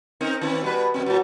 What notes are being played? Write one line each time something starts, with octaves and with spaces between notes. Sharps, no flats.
C4 D#4 A#4
D#3 C4
B2 G3 B4
F2 B2 C4
A2 F#3